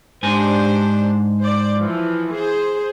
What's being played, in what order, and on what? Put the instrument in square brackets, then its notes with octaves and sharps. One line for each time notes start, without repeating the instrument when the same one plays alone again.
[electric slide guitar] G#2 G#5 [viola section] D4 G4 C5
[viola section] C5 D5
E3 F3
G#4 C5